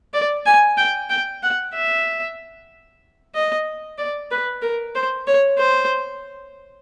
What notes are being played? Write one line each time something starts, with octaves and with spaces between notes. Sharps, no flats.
D5
G#5
G5
G5
F#5
E5
D#5
D5
B4
A#4
C5
C#5
C5